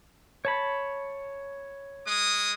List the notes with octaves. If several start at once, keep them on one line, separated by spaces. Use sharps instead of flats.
C#5 A5 B5
G#3 D#6